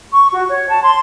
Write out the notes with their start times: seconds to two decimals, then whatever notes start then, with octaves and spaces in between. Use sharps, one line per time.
0.12 C#6
0.33 F#4
0.49 C#5
0.69 A5
0.83 C6